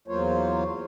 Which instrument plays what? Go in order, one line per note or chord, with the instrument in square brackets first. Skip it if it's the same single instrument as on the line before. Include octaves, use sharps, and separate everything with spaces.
[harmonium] E2 F#3 A#3 F4 C5 C#5